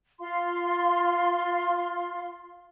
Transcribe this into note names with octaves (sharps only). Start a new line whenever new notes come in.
F4 F5 C6